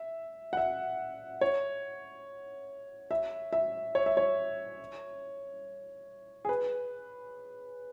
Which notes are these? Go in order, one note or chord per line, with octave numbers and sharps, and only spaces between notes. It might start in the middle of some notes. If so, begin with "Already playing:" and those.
Already playing: E5
F#5
E5
C#5
E5
E5
C#5
E5
C#5
G#4
B4